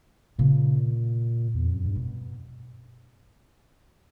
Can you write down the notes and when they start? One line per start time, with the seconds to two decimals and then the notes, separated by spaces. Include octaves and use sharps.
0.38 A#2 C#3
1.55 E2
1.64 F2
1.75 F#2
1.86 G2
1.96 B2